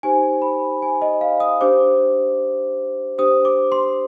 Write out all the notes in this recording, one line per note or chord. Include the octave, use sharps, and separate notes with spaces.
D#4 G4 C5 G#5
B5
G#5
D#5
F5
D#6
D4 G4 C5 D6
D4 G4 C5 D#6
D6
C6